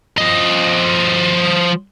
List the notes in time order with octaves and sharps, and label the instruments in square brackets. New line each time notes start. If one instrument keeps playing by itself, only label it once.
[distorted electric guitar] F3 D#5